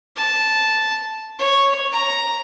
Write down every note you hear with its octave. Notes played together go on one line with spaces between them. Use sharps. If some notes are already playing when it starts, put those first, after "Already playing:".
A5
C#5
A#5